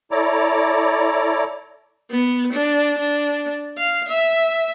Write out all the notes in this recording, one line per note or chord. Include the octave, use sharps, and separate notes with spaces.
E4 A4 C#5 D5 A#5 D6
B3
D4
D4
F5
E5